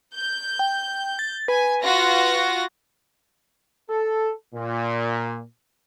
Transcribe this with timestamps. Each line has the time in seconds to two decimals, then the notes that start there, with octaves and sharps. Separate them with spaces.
0.15 G6
0.59 G5
1.19 A6
1.48 B4 G#5
1.83 F4 F#4 A#6
3.90 A4
4.55 A#2